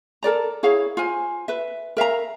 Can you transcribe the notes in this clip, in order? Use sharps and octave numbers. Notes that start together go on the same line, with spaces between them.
A4 A#4 D5 A#5
E4 G#4 C#5 F5
F4 C5 G#5
B4 E5
A#4 E5 F5 A#5